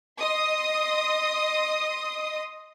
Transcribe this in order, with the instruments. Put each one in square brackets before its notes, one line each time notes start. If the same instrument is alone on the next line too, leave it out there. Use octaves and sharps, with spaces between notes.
[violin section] D#5 C6 D#6